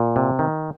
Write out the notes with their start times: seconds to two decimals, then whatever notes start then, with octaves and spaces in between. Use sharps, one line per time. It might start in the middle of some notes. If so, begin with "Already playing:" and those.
Already playing: A#2
0.16 C3
0.39 D#3